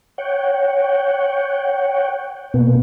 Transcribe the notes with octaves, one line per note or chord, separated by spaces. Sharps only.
C#5 F#5 G5
B2 A#3 B3